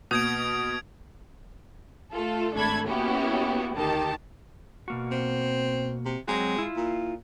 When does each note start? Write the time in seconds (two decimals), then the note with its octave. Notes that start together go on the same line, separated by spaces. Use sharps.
0.11 B2 A#3 D#6 G#6 D7
2.14 A3 F4 A4
2.53 G#1 A3 D4 A4 B5 G#6
2.86 A#3 B3 C#4 E4 F#4 G4
3.75 D2 D#3 G4 A5
4.88 B2 A#3 F#4
5.11 C4
6.05 C3
6.28 F#3 G#3 C4 F#4
6.59 E4 F4
6.76 A#2